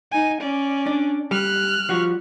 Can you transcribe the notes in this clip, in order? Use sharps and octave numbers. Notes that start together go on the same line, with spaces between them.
D#4 G#5
C#4 D5
D4
G3 F6 F#6
F3 G3 F#4